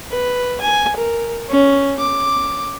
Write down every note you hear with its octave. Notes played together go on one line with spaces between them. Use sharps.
B4
G#5
A#4
C#4
D6